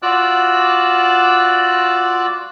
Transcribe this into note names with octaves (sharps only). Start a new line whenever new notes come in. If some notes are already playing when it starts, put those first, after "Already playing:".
F4 F#4 D5 D6 E6 F#6